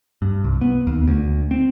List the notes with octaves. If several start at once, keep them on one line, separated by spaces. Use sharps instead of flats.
G2
C2
B3
D#2
D2
C4